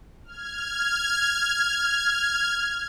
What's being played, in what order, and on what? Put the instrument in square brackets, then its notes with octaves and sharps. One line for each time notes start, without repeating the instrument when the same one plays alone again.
[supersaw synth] F6 G#6